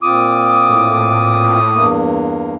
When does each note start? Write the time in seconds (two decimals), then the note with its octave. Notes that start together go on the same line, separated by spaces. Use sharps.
0.01 A#2 C4 F4 D6 D#6
0.70 A2
1.72 E2 G2 A#3